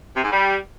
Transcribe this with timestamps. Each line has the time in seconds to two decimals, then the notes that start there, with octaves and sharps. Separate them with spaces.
0.16 C3
0.24 G#2
0.32 G3